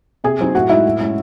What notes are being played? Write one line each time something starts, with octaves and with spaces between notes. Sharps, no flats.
C3 G#4 G#5
F#3 C4 D#4
A2 F#4 F#5
G#3 D#4 E4 E5
A2
G#3 C#4 E4